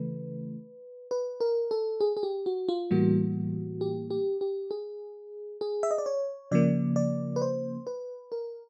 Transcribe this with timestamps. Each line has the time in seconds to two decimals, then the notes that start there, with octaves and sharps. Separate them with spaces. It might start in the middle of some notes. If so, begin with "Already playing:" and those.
Already playing: C#3 E3 A3 B4
1.11 B4
1.40 A#4
1.71 A4
2.01 G#4
2.17 G#4
2.23 G4
2.46 F#4
2.69 F4
2.91 A2 E3 G3 A#3 F#4
3.81 G4
4.10 G4
4.41 G4
4.71 G#4
5.61 G#4
5.83 E5
5.91 D#5
5.98 D5
6.06 C#5
6.51 C#3 F3 A#3 D5
6.96 D5
7.36 B4
7.42 C5
7.87 B4
8.32 A#4